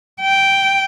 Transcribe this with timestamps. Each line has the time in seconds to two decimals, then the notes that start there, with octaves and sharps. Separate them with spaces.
0.21 G5